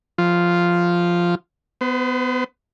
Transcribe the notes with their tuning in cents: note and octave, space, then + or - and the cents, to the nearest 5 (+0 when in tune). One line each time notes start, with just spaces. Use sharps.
F3 +0 F4 +0
B3 +20 C5 -30